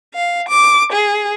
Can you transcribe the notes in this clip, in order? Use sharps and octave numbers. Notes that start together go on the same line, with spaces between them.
F5
D6
G#4